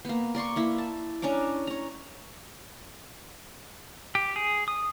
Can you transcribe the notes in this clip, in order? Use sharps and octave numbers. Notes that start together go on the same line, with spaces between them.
A#3 B3
A#4 D5 C6 C#6
A#3 E4
A5
C#4 D4 A#5 D6
C#5 A#5
G4
G#4
D#6